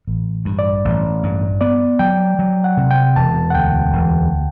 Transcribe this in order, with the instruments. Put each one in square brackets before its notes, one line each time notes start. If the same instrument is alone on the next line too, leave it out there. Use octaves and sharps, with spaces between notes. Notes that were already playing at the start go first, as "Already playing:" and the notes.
[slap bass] A1
G2
[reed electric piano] D5
[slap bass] A1
G2
[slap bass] B3 [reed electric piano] D5
[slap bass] F#3 [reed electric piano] G5
[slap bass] F#3
[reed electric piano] F#5
[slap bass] C3
[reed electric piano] G5
[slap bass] E1 [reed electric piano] A5
[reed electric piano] F#5
[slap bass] D2 [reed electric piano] G5
[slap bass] E1